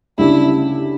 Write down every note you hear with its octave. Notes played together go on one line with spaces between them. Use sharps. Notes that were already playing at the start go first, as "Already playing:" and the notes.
D2 C#3 G3 D4 E4 G4